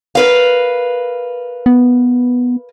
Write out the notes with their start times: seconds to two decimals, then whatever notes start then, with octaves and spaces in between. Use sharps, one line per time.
0.15 A#4 B4 F5
1.66 B3